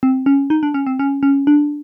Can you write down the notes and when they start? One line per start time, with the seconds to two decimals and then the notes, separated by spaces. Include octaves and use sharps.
0.03 C4
0.26 C#4
0.50 D#4
0.63 D4
0.74 C#4
0.87 C4
0.99 C#4
1.23 C#4
1.47 D4